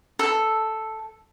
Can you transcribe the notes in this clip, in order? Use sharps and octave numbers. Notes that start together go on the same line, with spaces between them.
A4